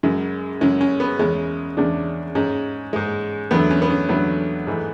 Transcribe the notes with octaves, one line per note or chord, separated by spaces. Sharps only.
F#2 C#3 G#3
F#2 C#3 G#3 C#4
C#4
B3
E2 C#3 G#3 C#4
E2 C#3 G#3 D4
G#2 G#3 C#4
G#2 G#3
E2 D3 F#3 A3 B3
C#4
B3
C#4
E2 D3 F#3 A3 B3
G#2 E3 A3